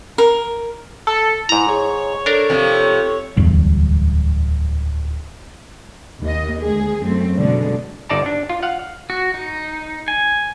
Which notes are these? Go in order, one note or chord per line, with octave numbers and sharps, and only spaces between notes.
A#4
A4
G#2 E4 A#5
G#4 C#5
D4 A4 A#4
C3 F3
D1 E2 G2
D#2 D#5
D2 G#3 G#4
F#2 A3 C4
B2 D3 G#3
G1 D#4 D5 A5 A#5
D4
F4
F5 F#5
F#4
D#4
G#5